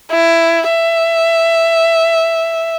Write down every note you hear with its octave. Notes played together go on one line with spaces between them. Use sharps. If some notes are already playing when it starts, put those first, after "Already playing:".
E4
E5